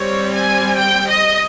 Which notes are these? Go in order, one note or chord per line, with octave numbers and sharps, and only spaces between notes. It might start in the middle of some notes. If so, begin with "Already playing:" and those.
Already playing: G3 C4 C#5
G#5
G5
D#5